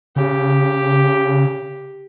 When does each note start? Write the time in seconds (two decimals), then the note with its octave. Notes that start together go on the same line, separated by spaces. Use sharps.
0.16 C#3 G4